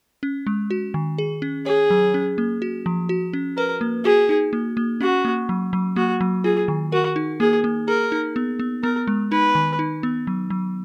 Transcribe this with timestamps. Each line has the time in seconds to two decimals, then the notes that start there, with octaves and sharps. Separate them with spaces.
0.23 C#4
0.47 G#3
0.70 F#4
0.94 D#3
1.18 G#4
1.42 C#4
1.66 G#4 C#5
1.90 F#3
2.14 C#4
2.38 A#3
2.62 F#4
2.86 F3
3.09 F#4
3.33 C#4
3.57 A#4 B4
3.81 A#3
4.05 F#4 G#4
4.29 D#4
4.53 A#3
4.77 A#3
5.01 C#4 F#4
5.25 A#3
5.49 F#3
5.73 F#3
5.96 A#3 F#4
6.21 F#3
6.44 F4 G#4
6.68 D#3
6.92 F#4 A#4
7.16 D#4
7.40 A#3 G#4
7.64 A#3
7.88 G#4 A#4
8.12 D#4
8.36 B3
8.59 B3
8.83 B3 A#4
9.07 G#3
9.31 D#4 B4
9.55 D#3
9.79 D#4
10.03 B3
10.27 F#3
10.50 F#3